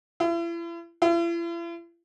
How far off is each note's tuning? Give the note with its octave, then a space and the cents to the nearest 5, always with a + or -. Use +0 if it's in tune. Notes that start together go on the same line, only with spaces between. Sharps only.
E4 +40
E4 +45